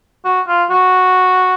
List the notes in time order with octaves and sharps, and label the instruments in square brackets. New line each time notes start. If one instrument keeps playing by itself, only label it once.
[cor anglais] F#4
F4
F#4